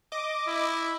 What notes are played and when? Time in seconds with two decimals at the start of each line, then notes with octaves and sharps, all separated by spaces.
0.12 D#5 D6
0.47 E4